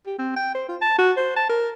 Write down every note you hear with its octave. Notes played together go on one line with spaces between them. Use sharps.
G4
C4
G5
C5
F4
A5
F#4
C5
A5
A#4